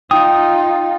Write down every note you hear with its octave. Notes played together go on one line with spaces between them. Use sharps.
D#4 F4 G5 D#6